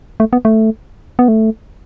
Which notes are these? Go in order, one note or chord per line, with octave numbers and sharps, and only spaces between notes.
A3
B3
A3
B3
A3